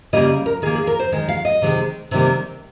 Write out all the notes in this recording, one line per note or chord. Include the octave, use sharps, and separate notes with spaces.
C#3 G3 A#3 D#5
A#4
D#3 A#3 G#4
G#4
A#4
C5
D#3 G#3
F5
D#5
C3 D#3 G#3
C3 D#3 G3 A#3